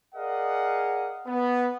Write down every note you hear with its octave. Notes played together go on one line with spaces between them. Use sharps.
G#4 A#4 D5 D#5 F5 F#5
B3